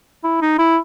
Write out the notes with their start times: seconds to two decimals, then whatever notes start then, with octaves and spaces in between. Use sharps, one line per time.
0.24 E4
0.41 D#4
0.59 E4